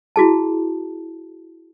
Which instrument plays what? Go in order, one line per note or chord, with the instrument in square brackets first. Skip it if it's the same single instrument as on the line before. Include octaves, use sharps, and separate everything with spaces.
[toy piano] E4 F#4 G#4 A5